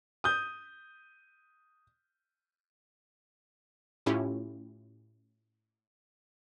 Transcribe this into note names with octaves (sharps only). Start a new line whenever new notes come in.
D#6 G6
A2 C#4 E4 F4 G4